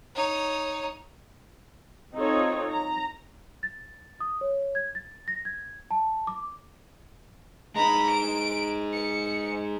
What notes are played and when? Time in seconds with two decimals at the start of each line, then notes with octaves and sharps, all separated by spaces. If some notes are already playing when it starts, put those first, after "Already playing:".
0.15 D#4 C#5
2.15 C4 D#4 F4 A4 C#5
2.71 A#5
3.63 A6
4.20 D#6
4.41 C#5
4.75 G#6
4.95 A6
5.28 A#6
5.45 G#6
5.91 A5
6.27 D6
7.76 G#3 D#4 A#5 B5
8.11 D7
8.94 C#7